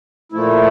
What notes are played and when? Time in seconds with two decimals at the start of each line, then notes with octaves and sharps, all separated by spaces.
0.32 A#2 F3 A3 E4